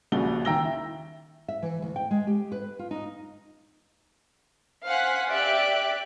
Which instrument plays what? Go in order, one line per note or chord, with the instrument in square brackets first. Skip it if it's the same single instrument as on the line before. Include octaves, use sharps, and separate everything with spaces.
[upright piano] D#1 A#1 C#3 F#4 G7
D#3 G5 A#5 E6 A#6 G7
E4
[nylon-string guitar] E5
E3
D2
G5
G#3
G4
B4
F4
D#4
[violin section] C5 F5 F#5 G#5 F#6 B6
G4 D5 E5 F#6 D7